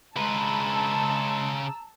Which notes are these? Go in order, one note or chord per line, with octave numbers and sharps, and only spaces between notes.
C#3 G#3 B4 A5 A#5 E6